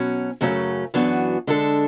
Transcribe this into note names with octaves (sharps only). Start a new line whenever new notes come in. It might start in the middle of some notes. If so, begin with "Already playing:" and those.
Already playing: B2 F#3 C#4
F#2 C#3 F#3 A3 C#4
F#2 E3 B3 D4 F#4
D3 G#3 D4 A4